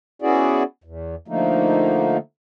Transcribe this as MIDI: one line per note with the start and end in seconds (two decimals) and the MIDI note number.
0.22 0.63 59
0.22 0.63 61
0.22 0.63 64
0.22 0.63 66
0.22 0.63 68
0.22 0.63 74
0.84 1.15 40
1.28 2.18 50
1.28 2.18 53
1.28 2.18 57
1.28 2.18 58
1.28 2.18 63